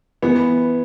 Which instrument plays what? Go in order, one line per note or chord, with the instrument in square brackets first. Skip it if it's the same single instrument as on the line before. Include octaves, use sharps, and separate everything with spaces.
[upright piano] E3 [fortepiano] B3